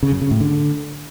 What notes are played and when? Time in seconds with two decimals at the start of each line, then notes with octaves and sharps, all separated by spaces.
0.03 C#3
0.12 F#2
0.22 C#3
0.31 A2
0.41 D3